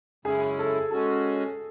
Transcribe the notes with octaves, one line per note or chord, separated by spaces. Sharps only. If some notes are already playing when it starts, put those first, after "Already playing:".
F#2 C#3 G#3 C#4 E4 G#4
A4
G#3 C#4 F#4 A4